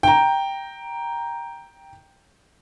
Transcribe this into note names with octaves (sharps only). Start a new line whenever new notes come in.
G5 A#5